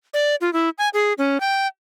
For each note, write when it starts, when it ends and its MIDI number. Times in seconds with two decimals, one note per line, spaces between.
0.14 0.36 74
0.41 0.53 65
0.53 0.69 64
0.78 0.89 80
0.94 1.13 68
1.18 1.40 61
1.40 1.67 79